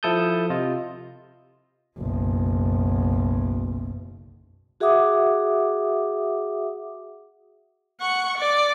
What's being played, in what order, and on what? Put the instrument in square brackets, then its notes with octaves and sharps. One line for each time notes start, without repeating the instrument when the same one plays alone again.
[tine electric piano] F3 E4 A4 A5 D#6 G6
C3 F4 D#5
[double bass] F#1 B1
[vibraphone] F#4 G#4 E5 F#5 D6 D#6
[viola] F#5 C#6
D5